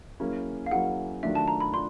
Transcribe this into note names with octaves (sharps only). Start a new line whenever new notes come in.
F#3 A#3 C#4 E4 G#4
F5
F#3 A#3 C#4 E4 G#4 F#5
D#3 F#3 A3 D4 F4 E5
A5
A#5
B5
D4 F4 C6